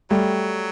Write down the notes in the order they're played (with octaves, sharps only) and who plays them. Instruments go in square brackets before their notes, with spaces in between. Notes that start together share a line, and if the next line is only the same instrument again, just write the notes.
[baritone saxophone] F#3 [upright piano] G3 A3